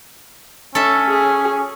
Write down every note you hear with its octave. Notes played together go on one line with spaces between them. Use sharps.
C#4 A4 E5
G#4